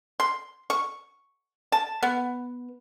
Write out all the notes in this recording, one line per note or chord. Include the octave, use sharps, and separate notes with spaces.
C6
C#6
A5
B3